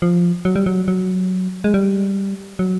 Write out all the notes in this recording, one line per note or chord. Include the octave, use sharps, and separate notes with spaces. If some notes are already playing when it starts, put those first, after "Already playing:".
F3
F#3
G3
F#3
F#3
G#3
G3
F#3